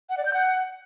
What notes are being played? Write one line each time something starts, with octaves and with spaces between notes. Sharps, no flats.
F#5
D5
G6
F#5